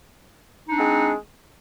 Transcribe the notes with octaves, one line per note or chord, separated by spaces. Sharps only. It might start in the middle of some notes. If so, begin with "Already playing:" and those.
G#3 C4 D4 D#4